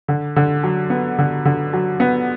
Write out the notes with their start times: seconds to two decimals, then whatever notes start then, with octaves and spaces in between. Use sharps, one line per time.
0.08 D3
0.36 D3
0.63 F#3
0.90 B3
1.19 D3
1.45 D3
1.73 F#3
2.00 B3